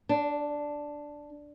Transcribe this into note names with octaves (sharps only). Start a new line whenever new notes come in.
D4